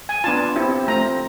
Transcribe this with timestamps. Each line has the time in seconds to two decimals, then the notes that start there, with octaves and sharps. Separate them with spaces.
0.09 G#5
0.24 B3 D4 F4 A5
0.55 C4 E4 G4
0.87 A3 C4 F4 A#5